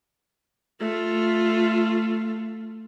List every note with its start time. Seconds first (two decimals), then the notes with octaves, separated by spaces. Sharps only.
0.80 A3 F4